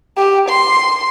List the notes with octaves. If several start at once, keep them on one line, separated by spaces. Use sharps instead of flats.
G4
C6